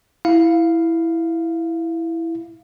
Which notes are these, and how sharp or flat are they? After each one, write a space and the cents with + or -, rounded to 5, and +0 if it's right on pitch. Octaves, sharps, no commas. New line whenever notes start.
E4 +0 F5 +0